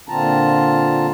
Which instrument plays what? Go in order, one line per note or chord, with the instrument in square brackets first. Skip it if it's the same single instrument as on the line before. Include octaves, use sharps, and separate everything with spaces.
[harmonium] A#2 D3 C4 F4 A5 A#5